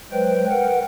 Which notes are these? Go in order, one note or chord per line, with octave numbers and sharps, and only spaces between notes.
F#3 G#3 B4 C5 G5
A#4 B4 F#5 G5